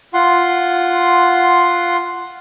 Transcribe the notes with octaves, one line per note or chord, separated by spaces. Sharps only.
F4 F#5 C6